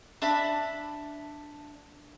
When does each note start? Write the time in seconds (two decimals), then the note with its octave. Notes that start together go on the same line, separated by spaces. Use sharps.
0.22 D4 E5 A5 B5